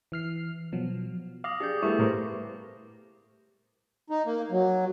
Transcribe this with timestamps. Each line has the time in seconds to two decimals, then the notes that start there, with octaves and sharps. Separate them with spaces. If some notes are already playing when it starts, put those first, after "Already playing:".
0.12 E3 F6 C7
0.72 B2 F3 F#3
1.44 F5 D6 D#6 A#6
1.60 D4 G4 G#4 G6
1.83 G3 A3 B3 E4 G4 B4 C#6
1.99 A2 A#4 C5
4.10 D#4
4.26 A#3
4.51 F#3